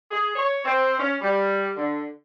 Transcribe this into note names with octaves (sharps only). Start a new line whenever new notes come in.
G#4
C#5
C4
C#4
G3
D3